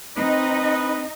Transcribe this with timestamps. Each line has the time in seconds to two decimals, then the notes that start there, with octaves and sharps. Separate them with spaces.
0.17 C4 D#4 B4 D#5